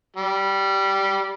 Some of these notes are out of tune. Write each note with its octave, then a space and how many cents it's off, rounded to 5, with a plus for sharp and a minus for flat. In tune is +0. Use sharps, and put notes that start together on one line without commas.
G3 -10